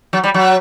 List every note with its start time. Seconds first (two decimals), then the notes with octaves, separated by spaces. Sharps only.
0.13 F#3
0.24 G3
0.34 F#3